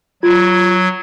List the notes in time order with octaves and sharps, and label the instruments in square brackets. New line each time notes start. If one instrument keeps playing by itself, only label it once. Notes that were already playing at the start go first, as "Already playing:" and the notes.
[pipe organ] F#3 G#6 [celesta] F4